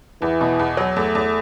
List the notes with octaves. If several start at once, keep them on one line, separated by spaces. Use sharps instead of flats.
E2 E3
B2
E2
F#3
E2 A3
E2